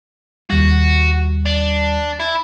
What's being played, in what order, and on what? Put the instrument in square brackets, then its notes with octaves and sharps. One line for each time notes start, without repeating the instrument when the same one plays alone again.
[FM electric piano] D#2 G3 [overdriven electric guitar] F#4
[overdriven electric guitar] D4
E4